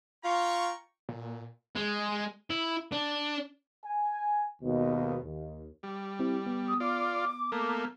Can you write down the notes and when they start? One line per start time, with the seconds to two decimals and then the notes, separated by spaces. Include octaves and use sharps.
0.24 F4 G5 A#5 C#6
1.09 A#2
1.76 G#3
2.50 E4
2.92 D4
3.85 G#5
4.62 G#1 D#2 B2
5.24 D#2
5.83 G3
6.19 C4 E4 G4
6.46 B3
6.68 D#6
6.80 F4 D5 D6
7.52 A3 A#3